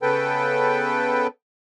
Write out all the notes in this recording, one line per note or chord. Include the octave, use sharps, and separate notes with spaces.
C#3 B3 A4 B4 G5